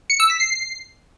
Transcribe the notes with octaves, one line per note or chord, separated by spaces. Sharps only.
C#7
E6
B6
C7